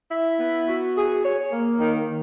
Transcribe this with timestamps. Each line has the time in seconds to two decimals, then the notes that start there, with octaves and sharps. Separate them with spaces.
0.10 E4
0.38 B3
0.66 F#4
0.95 G#4
1.22 C#5
1.51 A#3
1.79 D#3
2.06 D#3